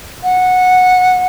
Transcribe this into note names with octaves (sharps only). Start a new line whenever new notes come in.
F#5